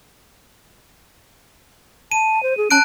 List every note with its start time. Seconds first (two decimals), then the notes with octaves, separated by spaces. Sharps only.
2.12 A5 D#7
2.43 C5
2.57 G#4
2.71 C#4 A5 F#6 D7